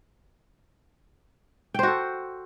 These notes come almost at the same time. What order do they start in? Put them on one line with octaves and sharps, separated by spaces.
G5 C5 F#4 A4